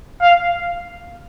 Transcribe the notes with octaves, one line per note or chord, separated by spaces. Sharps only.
F5